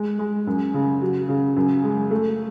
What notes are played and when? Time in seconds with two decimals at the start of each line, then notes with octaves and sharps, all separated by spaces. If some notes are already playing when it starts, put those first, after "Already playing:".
Already playing: G#3
0.19 G#3
0.47 F#2
0.74 C#3
1.02 F#3
1.29 C#3
1.56 F#2
1.84 G#3
2.11 A3